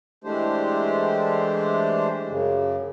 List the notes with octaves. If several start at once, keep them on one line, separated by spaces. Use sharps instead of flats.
E3 G#3 A3 D4 G4 C5
F#2 C#3